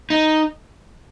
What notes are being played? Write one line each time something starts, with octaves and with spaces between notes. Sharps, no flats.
D#4